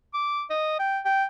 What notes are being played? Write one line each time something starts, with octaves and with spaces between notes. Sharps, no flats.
D6
D#5
G5
G5